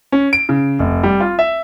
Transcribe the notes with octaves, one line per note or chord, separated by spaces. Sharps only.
C#4
D7
C#3
F1
G3
F4
E5